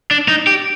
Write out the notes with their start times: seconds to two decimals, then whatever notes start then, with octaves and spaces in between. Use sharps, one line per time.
0.11 D4
0.28 D#4
0.47 G4